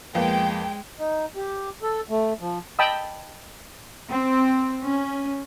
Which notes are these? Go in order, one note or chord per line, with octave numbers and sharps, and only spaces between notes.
F2 G#3 A#3 B3 G5
D#4
G4
A4
A3
F3
D#5 G5 A5 B5 D#6 E6
C4
C#4